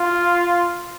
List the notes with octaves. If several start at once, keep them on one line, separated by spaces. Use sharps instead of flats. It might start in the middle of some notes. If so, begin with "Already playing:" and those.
Already playing: F4